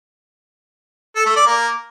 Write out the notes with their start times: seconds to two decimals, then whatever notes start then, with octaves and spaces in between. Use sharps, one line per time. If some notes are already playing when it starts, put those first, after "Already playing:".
1.16 A4
1.26 A3
1.36 D5
1.46 A#3